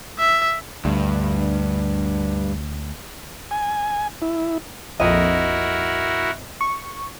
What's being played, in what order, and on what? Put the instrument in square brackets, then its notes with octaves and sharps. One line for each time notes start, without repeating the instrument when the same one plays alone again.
[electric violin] E5
[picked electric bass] D2 [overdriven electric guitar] G2
[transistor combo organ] G#5
E4
[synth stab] A#1 F2 [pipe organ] E4 F#4 A#4 [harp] D#5
[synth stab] C#6